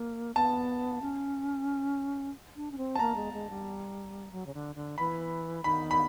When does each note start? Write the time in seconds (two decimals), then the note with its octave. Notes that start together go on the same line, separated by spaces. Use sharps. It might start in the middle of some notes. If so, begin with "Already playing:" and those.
Already playing: A#3
0.35 B3 A5
1.02 C#4
2.56 D4
2.72 C#4
2.78 C4
2.96 A5
2.99 A#3 A#5
3.16 G#3
3.33 G#3
3.50 G3
4.32 F#3
4.46 C#3
4.54 D3
4.75 D3
4.98 E3 B5
5.64 D#3 B5
5.91 B5